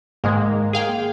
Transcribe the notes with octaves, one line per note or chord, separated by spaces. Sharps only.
G#2 D#3 G#3 A#3
G#4 F5 G5